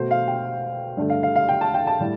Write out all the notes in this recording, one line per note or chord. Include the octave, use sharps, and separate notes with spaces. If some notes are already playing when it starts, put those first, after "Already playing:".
Already playing: B2 A3 C5
F5
G5
G2 D3 A3
F5
F5
F5
G5
A5
G5
A5
A2 G3